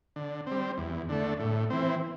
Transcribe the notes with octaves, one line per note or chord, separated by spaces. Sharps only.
D3
G3 C4
E2
D3 A3
A2
E3 C4